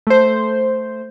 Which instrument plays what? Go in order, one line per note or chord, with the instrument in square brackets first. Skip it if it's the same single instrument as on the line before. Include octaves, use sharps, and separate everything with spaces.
[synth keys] A3 C5